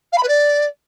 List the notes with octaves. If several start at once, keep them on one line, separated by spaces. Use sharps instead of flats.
F5
B5
B4
D5